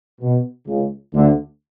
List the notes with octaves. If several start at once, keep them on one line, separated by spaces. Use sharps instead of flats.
B2
C#2 C#3
D2 D3